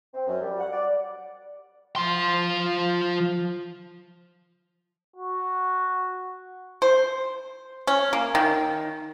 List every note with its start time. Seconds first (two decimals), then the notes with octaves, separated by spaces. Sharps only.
0.14 C4
0.27 F#2
0.42 G3
0.59 F#5
0.71 D5
1.96 F3 C6
5.16 F#4
6.82 C5
7.87 C#4
8.13 A#3
8.35 D#3